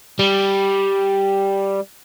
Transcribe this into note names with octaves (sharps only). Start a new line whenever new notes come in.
G3